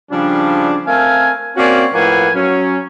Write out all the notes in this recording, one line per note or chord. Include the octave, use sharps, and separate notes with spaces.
C#3 F3 G3 D4
A3 C4 A#4 F5 G#5
A#3 C4 C#4 F#4 D5 G#5
A2 F3 A#3 B4 F#5 G#5
F#3 C#4